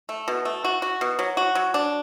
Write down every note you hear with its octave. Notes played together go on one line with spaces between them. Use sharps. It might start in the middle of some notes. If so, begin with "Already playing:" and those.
A3
B2
A3
F#4
F#4
B2
F#3
F#4
F#3
D4